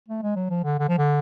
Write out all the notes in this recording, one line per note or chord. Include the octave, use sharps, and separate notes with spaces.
A3
G#3
F#3
F3
D3
D3
F3
D3